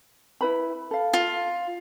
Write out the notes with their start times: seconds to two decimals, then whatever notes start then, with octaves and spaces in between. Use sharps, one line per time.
0.41 E4 B4 B5
0.91 A4 F5
1.14 F4